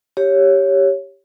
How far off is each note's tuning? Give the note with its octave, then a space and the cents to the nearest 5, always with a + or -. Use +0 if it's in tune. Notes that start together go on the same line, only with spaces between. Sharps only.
G4 +0 C#5 +0